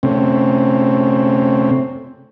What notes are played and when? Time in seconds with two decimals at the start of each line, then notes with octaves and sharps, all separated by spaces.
0.03 C3 A3 C4 C#4